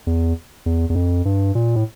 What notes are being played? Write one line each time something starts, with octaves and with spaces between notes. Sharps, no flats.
E2
E2
E2
F2
G2
A#2
A2